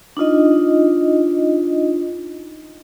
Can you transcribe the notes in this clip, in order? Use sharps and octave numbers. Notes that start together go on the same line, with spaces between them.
D4 D#4 F4 D#5